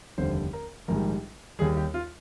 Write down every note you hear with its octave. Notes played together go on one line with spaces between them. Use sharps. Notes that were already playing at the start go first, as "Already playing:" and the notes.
F1 D#2 D3 G3 C5
A#4
A#1 G#2 D#3 G3 A#4
D#2 D#3 G3 G#4
G4
F4